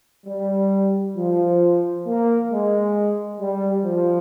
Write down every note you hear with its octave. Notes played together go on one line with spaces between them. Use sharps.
G3
F3
A#3
G#3
G3
F3